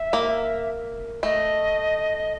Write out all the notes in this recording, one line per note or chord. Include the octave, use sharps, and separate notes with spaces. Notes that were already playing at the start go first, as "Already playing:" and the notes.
Already playing: E5
A#3
A3 D#5